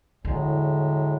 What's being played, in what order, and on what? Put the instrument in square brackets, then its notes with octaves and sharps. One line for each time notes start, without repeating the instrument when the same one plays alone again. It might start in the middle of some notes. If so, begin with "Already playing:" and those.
[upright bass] E2 D3 [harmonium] A2 F#3 G#3